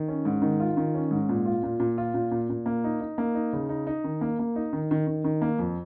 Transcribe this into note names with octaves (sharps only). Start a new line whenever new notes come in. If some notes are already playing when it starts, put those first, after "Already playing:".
Already playing: D#3
C#4
G#2
D#3
F4
D#3
C#4
G#2
A#2
F4
A#2
A#2
F4
A#2
A#2
A#2
A#3
D#4
D#4
A#3
D#4
C#3
D#4
D#4
D#3
A#3
A#3
D#4
D#3
D#3
D#3
D#3
A#3
F2